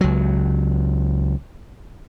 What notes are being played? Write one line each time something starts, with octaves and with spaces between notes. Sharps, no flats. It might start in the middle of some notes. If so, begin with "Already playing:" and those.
C#2 F#3